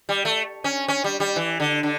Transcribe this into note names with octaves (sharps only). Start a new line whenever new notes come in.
G3
A3
C#4
C#4
G3
G3
E3
D3
D3